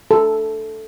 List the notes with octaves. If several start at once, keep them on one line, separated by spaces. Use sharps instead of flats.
A4